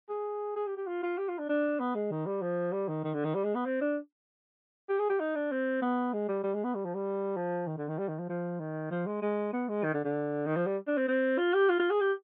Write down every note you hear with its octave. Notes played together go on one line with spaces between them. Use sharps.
G#4
G#4
G4
G4
F4
F4
G4
F4
D4
D4
B3
G#3
D#3
G3
F3
G3
D#3
D#3
D3
D#3
G3
G#3
B3
C4
D4
G4
G#4
G4
D#4
D4
C4
B3
G#3
G3
G3
G#3
B3
G3
F3
G3
F3
D#3
D3
D#3
G3
D#3
F3
F3
D#3
F3
G#3
G#3
B3
G#3
D#3
D3
D3
D#3
F3
G3
D4
C4
C4
F4
G4
F4
F4
G#4
G4